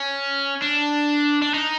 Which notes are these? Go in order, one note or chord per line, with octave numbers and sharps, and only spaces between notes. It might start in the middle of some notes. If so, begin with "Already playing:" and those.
Already playing: C#4
D4
D4
D#4